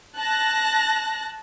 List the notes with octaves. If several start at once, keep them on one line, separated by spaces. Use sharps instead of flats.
A5 F#6 A#6